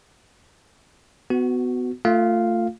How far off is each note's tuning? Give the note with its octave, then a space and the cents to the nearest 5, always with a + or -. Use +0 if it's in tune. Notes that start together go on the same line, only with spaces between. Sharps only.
B3 +25 F#4 +0
A3 +30 F4 +0 F5 +0